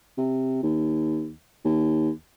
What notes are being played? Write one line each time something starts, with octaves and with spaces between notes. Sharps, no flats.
C3
D#2
D#2